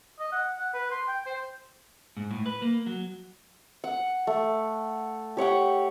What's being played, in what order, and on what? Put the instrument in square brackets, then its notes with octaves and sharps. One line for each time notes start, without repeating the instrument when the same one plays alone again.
[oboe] D#5
F#5
F#5
B4
C6
G5
C5
[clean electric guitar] G#2
A2
B4
A#3
F#3
[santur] F#5
A3
G4 C#5 F#5 G5